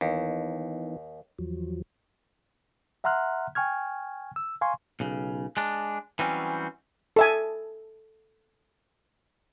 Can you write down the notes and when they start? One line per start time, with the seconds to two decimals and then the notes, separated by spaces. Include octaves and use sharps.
0.01 D#2 E3 B3 D#4
1.38 E2 F3 F#3
3.04 E5 F#5 A#5 C6 F6 F#6
3.55 G5 G#5 C#6 F6 G#6
4.36 E6
4.61 F5 G#5 C6 C#6
5.00 B1 C#3
5.57 G#3 D4
6.19 E3 F#3 G3 C4 C#4
7.16 A4 E5 G#5